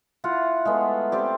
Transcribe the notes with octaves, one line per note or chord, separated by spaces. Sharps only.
E4 F4 F#5
G#3 A3 B3
C4 G4 D5